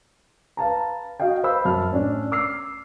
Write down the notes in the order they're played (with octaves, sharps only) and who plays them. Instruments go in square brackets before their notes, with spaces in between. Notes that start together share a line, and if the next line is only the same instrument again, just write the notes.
[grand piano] B4 F5 A5 A#5
F#4 D#5 F5 G5
B4 C5 F5 B5 E6
F#2 A5 F6
A2 C#4 D4
D6 E6 F6 C7